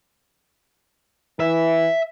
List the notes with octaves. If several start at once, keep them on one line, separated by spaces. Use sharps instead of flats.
E3 E5